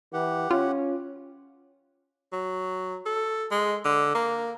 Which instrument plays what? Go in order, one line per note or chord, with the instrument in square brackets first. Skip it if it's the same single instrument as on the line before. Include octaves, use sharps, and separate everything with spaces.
[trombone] E3 [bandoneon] G4 F#5
[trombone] C#4 [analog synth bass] F4
[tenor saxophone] F#3
A4
G#3
D3
A#3